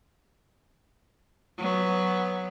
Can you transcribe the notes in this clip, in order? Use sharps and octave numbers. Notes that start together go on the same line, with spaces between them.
F#3 B3